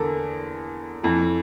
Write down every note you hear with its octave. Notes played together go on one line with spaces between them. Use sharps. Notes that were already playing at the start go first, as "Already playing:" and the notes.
Already playing: E2 D3 A4 A#4
F2 E3